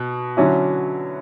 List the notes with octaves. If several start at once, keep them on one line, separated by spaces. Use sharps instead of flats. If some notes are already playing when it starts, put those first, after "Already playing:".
Already playing: B2
D3 F#3 C#4 E4